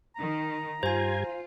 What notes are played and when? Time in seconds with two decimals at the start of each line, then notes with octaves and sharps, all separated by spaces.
0.16 D#3 A#5
0.83 G2 F4 G4 C5 G#5 G#6